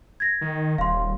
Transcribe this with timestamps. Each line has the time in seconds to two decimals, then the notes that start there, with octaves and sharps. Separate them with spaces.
0.20 G#6 A#6
0.41 D#3
0.78 D#1 F5 C6